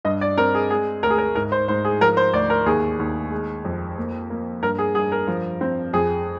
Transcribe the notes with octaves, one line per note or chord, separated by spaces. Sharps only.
G2 D#5
D5
C4 A#4
G#4
G#3 G#4
D2 A#4
G#4
A#4
G#2 A#4
C5
G#2 C5
G#4
F3 A#4
C5
D2 D5
A#4
D#2 G#4
D#2
G#3
F2
A#3
A#3
G2 A#4
G#4
G2 G#4
A#4
F3
C4
F2 G#4